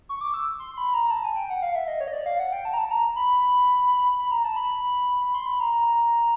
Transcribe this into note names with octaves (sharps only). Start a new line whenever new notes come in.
C#6
D6
E6
C6
C6
B5
A#5
A#5
A5
G#5
G5
F#5
F5
E5
D#5
C#5
D#5
D5
F5
F#5
G5
A5
A#5
A5
A#5
B5
B5
A#5
A5
B5
B5
C6
B5
A#5
A#5